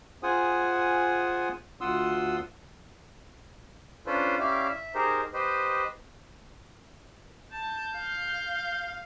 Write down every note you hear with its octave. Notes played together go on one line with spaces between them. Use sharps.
F4 G#4 C5 F#5 G#5 D#6
D2 F4 F#5 C6 D#6 E6
C#4 D4 F4 A4 B4 C5
C#4 E4 G4 D5 E5 F5
E5
D#4 G4 G#4 A#4 C5
G4 B4 C5 D#5
A5 G6
F5